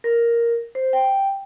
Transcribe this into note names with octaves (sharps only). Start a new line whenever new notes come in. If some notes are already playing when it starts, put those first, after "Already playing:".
A#4
C5
G5